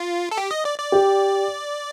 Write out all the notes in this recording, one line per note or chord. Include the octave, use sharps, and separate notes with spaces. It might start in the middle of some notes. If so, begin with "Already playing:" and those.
Already playing: F4
A4
G4
D#5
D5
D5
G4